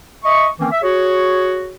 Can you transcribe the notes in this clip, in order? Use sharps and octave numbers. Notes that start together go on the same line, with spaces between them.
D#5 E5 C#6
D#3 E3 A#3 C4 C#4
E5
F#4 G#4 C#5